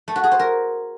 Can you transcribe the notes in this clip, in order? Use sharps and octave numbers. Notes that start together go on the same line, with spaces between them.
A3
F#4
G#4
C5
A#4